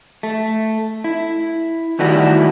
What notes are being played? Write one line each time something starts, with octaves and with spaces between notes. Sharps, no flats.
A3
E4
D#3 E3 G3 A3 E4 F#4